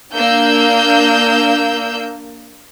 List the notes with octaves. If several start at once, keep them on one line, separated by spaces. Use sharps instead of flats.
A#3 D4 E6 G6